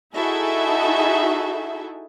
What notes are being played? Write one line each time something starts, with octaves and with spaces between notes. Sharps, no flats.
D#4 E4 F#4 G#4 A4 E5